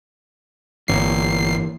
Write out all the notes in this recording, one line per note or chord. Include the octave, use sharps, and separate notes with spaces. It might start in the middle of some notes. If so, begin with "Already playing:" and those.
G1 E3 A#3 C#5 C7